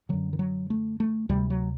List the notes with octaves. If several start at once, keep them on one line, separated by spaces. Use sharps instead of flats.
F#2 D3 F#3
D#3
F#3
A3
A3
D2 C3 G3
F#3